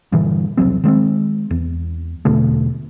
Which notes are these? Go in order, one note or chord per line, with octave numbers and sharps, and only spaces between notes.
G2 A#2 D3 E3
E1 C2 F#3 C4
D#3 G#3 B3 C4
E2
E2 B2 D3 A3